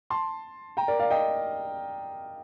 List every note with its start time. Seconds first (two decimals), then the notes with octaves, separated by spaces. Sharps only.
0.10 A5 C6
0.77 G5 A#5
0.88 A#4 D5
0.99 D5 F5
1.10 D#5 G5